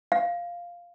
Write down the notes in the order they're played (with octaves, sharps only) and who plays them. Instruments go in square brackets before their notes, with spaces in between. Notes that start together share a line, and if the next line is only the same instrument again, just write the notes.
[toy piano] F5